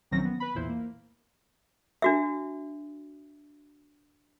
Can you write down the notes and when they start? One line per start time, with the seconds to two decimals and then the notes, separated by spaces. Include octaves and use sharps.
0.11 A#1 D#3 F#3 C4 C#4 A#6
0.25 B3
0.40 B4 B5
0.55 B1 E2 A#2 E3 E4 C5
0.69 A#3
2.02 D4 F#4 E5